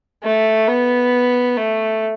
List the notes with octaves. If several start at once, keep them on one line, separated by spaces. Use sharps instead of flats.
A3
B3
A3